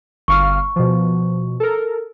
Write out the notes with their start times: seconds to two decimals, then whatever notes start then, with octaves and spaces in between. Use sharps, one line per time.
0.28 G1 F5 C#6 F6
0.76 B2 F3
1.60 A4 A#4